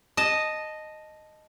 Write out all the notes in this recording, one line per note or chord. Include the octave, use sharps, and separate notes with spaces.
D#5 A5